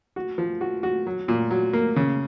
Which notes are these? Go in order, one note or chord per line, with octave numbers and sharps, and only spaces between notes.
F#4
F3
F#4
F#4
F#3
A#2
F#3
A#3
C#3